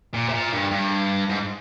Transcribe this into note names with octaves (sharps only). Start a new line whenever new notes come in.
A#2
C3
A#2
G2
G2
G#2